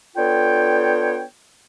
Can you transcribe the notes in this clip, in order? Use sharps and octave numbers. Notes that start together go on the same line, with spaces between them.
B3 D4 F4 A4 C#5 G5